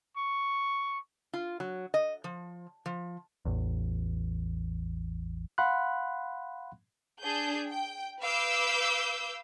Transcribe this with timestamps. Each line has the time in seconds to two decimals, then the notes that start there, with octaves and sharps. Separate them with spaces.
0.17 C#6
1.33 F4
1.60 F#3
1.94 D#5
2.24 F3
2.86 F3
3.45 A1 E2
5.58 F5 F#5 B5 C6 F#6
7.20 D4 G#4 G6
7.69 G5
8.21 B4 F5 D6 E6 G6